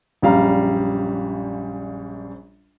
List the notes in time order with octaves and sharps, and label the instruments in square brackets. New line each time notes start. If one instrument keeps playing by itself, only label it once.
[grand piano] A#1 F#2 G3 F5 A#5